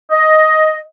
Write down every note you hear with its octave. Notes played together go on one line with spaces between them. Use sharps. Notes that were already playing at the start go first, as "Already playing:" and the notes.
D#5